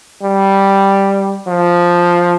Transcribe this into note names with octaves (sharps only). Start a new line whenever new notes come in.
G3
F3